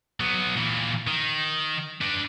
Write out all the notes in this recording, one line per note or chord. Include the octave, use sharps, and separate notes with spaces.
F#3 B3
A#2 E3
D#3
D4 B4